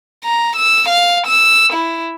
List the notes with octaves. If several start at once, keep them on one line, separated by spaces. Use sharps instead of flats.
A#5
E6
F5
E6
E4